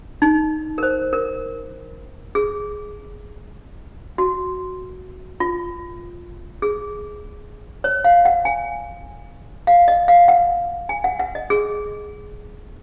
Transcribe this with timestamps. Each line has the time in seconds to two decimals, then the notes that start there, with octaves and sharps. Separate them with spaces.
0.22 D#4
0.78 A#4
0.83 C5
1.13 A#4
2.35 G#4
4.18 F#4
5.40 F4
6.62 G#4
7.84 C#5
8.04 F5
8.25 F#5
8.45 G#5
9.67 F5
9.88 D#5
10.08 F5
10.28 F#5
10.89 G#5
11.04 F#5
11.19 F#5
11.35 D#5
11.50 G#4